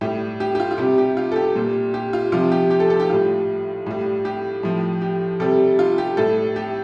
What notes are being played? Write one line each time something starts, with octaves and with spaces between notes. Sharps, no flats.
A2 G3 G4
G4
G4
F4
F4
C3 G3 G4
G4
F4
A4
G4
A#2 G3
G4
F4
C3 F3 F4
G4
G4
A4
A4
G4
A2 G3 F4
A2 G3
G4
A2 F3
G4
C3 G3 A4
F4
G4
A2 G3 A4
G4